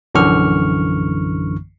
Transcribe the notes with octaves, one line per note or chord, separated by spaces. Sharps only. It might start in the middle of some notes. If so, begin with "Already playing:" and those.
A#1 F#2 D3 E3 C#6 F6